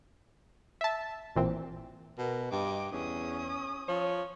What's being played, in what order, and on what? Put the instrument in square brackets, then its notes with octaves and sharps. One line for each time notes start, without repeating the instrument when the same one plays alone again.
[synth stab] E5 A5
A1 A#2 E3 C4
[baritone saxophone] B2 [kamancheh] A#4
[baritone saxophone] G2 [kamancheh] D#5 D6
[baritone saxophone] E2 [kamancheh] C#4 D#6
[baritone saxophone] F3 [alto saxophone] C#5